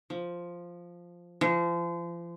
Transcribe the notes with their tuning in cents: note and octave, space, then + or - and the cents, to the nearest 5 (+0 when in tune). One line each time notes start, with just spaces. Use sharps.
F3 +0
F3 -35